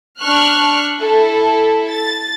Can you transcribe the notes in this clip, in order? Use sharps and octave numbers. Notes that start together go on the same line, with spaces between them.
D4 C#6 F6 F#6
E4 A4
A6